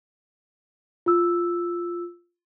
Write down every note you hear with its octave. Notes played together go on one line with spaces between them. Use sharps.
F4 E6